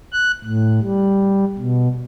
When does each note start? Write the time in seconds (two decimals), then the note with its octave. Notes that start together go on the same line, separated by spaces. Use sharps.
0.13 F#6
0.44 A2
0.81 G3
1.58 B2